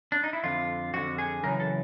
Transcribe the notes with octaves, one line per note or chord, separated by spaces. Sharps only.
D4
D#4
E4
F2 D3 F4
F2 D3 F#4
G#4
F#2 C#3 E3 A#4
A4